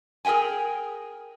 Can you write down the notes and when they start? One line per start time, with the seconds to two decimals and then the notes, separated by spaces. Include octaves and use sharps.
0.25 G#4 A#4 E5 G5 G#5